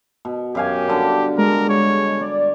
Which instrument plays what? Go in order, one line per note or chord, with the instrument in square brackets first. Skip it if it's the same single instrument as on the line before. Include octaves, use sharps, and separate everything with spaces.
[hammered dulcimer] B2
[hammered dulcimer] F#2 F5 G#5 [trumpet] G4
[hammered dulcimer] D3 G3
[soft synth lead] G#3 [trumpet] A#4
[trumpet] C#5
[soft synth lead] D5